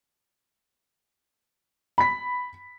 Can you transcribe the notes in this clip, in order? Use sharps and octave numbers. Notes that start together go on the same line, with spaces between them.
B5 B6